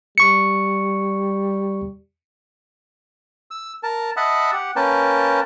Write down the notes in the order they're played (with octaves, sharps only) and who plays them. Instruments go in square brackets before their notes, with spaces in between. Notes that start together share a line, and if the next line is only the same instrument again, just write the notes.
[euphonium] G3 [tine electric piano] C#6 C#7
[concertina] E6
A#4 A5
D#5 E5 F#5 A5 B5
G4 F#5
A#3 C#4 A#4 B4 G5 A5